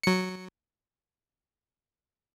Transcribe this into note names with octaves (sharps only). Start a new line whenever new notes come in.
F#3 C#7